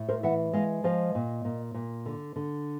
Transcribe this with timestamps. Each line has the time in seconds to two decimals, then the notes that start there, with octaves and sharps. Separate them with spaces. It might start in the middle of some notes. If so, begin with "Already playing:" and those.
Already playing: A2
0.09 A#4 C5
0.23 E3 E5 F#5
0.53 G#3 D#5 F5
0.84 F3 D#5 F5
1.15 A#2
1.45 A#2
1.74 A#2
2.06 D3
2.36 D3